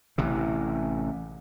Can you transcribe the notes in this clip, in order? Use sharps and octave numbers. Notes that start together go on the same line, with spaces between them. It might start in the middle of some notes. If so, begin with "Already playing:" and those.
A1 C3 E3